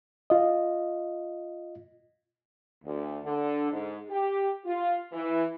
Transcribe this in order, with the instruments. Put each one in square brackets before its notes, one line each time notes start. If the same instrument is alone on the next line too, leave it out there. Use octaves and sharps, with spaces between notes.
[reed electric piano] F4 D#5
[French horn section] D2
D3
G#2
G4
F4
E3